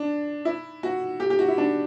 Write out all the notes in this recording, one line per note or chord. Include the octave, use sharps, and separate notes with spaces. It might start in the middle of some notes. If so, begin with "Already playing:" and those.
Already playing: D4
E4
F#4
G4
G4
F#4
E4
D4